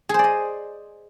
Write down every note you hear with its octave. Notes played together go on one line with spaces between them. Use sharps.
G#4 C5 D5 D#5